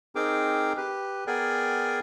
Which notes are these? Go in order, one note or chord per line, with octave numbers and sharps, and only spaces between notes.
C4 D#4 G#4 A#4 G5 D6
G4 B4
B3 G#4 A#4 D5 G5 G#5